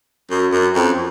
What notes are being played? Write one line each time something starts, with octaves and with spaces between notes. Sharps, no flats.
F#2
F#2
F2